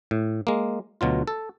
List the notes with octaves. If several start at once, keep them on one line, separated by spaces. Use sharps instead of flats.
A2
G#3 A#3
D2 B2 F#3 F4
A4